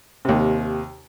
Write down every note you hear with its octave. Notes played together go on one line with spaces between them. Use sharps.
D#2 C3